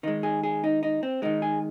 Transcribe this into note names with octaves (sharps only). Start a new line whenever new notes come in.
D#3 G#3 D#4
G#4
G#4
D#4
D#4
C4
D#3 G#3 D#4
G#4